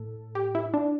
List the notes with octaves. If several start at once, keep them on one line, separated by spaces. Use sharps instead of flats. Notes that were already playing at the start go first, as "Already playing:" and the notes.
Already playing: A2 A4
G4
E4
D4